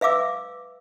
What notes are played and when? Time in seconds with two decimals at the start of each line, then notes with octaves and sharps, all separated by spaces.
0.01 B4 E5 F5 D6 E6